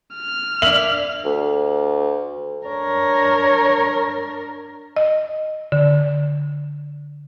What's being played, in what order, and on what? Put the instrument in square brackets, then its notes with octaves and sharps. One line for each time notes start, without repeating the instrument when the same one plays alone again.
[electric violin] F6
[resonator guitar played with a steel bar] A#3 D4 [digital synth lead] E5 [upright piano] F#7
[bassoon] D2
[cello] D4 A#4 [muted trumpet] C#5
[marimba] D#5
D3